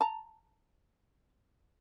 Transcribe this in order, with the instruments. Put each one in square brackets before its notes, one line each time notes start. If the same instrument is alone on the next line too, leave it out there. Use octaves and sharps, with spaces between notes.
[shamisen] A5 A#5